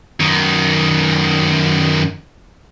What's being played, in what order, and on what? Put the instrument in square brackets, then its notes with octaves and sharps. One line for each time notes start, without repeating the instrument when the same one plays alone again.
[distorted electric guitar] F#2 D#3